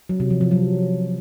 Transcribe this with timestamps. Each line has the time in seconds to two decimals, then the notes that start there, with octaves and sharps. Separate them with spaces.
0.09 F#3
0.20 C3
0.30 F3
0.41 F3
0.51 F#3